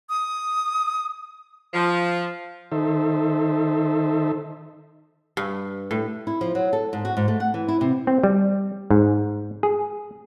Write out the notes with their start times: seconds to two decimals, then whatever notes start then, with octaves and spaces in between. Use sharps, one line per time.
0.09 D#6
1.74 F3
2.72 D#3 D#4 A4 C5 E5
5.37 G2
5.91 A2
6.27 E4
6.41 F3
6.55 F#3
6.73 A4
6.93 G#2
7.05 F#4
7.17 G#2
7.28 A3
7.40 F#5
7.54 E3
7.68 E4
7.81 C3
8.07 C4
8.24 G3
8.91 G#2
9.63 G#4